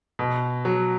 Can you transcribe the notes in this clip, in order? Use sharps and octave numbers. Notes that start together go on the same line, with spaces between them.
B2
F#3